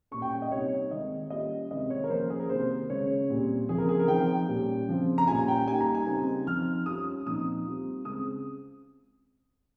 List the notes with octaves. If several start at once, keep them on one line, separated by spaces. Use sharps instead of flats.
A#2 G3 C#4 C#6
G5
G5
D#5
C3 G3 A#3 D#4 C#5
D#3 G#3 C4 D#5
G3 A#3 C#4 F4 D#5
C3 D#3 G#3 C4 D#5
C#5
A#4
F3 A#3 C#4 C5
A#4
G#4
A#4
C3 D#3 A#3 C5
C#3 G#3 C#4 C#5
A#2 G3 C4
C#3 F3 C4 G#4
A#4
G#4
A#4
F3 C4 D#4 G5
A#2 G3 C#4
C#3 F3 C4 F4
A#5
A#2 G3 C#4 F4 G#5
G5
G3 A#3 D#4 G#5
A#5
G#5
C#3 G3 C4 D#4
F3 C4 D#4 F6
G3 C#4 F4 D#6
A#2 F3 C4 D#4 D#6
G3 C4 F4
C#3 G#3 C4 D#6